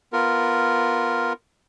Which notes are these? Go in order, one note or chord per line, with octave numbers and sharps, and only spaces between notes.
B3 F4 A#4